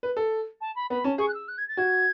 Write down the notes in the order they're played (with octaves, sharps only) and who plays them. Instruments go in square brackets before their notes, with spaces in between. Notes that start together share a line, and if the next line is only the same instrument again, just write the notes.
[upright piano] B4
A4
[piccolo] A5
B5
[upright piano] B3 [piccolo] B5
[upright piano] C#4 [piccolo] A5
[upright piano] G#4 [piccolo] C#6
[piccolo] F#6
E6
F#6
G#6
A6
[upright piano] F#4 [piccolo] G#6